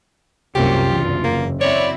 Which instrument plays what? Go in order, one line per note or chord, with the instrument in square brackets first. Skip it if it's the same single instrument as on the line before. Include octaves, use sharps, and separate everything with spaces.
[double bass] C2 F#2 [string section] F#3 A#3 [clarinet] F4 [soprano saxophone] G4
[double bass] F#1 [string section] E2 G2
[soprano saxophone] A#3
[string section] C4 E4 F#4 [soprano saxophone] C#5 [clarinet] D5